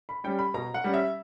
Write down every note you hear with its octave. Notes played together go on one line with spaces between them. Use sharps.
B5
G3 C#4 G5
B5
B2 A#5
F#5
G3 C#4
E5